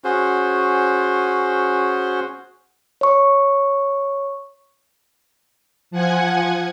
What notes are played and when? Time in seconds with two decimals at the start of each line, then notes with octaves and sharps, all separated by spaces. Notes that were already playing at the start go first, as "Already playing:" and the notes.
0.04 C#4 F#4 G#4 C5
3.01 C#5 C#6
5.91 F3 F#5 G#5 G#6